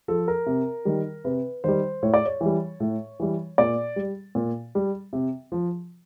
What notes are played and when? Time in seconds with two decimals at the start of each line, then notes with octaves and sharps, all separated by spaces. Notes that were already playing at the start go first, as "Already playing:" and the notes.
0.08 F3 A4
0.28 A#4
0.46 C3
0.85 D#3 G3
1.24 C3 B4
1.64 D#3 G3 C5
2.03 A2 C#5
2.14 D5
2.26 C#5
2.41 E3 G3
2.80 A2
3.20 E3 G3
3.58 A#2 D5
3.96 G3
4.35 A#2
4.75 G3
5.13 C3
5.52 F3